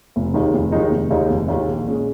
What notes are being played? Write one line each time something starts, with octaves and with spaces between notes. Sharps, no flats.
F1
D#2 D#3 G#3 D#4
F1
D#2 D#3 G#3 D#4
F1
D#2 D#3 G#3 D#4
F1
D#2 D#3 G#3 D#4
A#1
A#2 G#3 C#4 G#4